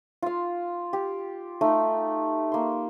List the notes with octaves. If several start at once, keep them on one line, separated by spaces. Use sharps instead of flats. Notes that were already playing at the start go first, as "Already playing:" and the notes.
F4 F5
G4
A3 D#4 F5
A#3 C6